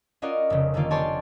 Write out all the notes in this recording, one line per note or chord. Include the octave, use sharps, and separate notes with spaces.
C#4 F4 F#4 A#4 D5 D#5
F1 C#3
D3 D#3 G3 A#3 F4
G4 C#5 D5 G#5 A5 C6